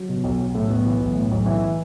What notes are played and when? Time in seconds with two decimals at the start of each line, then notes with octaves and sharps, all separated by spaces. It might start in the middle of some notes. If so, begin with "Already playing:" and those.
Already playing: F#3
0.09 B2
0.24 B1
0.40 B1
0.55 A2 A3
0.70 B1 B3
0.86 E3
1.00 B1
1.15 A2
1.31 B1
1.46 E3 E4